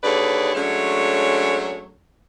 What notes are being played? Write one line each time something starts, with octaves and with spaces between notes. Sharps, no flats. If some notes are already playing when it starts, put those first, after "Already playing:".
D#2 D3 G#4 B4 C#5 D5
F#3 G#3 A3 C#4 D4 C#5